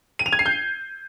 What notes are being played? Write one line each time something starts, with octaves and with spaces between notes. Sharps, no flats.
D#7
F7
G#6
C7
G6